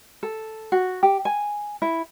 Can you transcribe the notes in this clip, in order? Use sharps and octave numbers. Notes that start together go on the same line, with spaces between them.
A4
F#4
G4
G#5
E4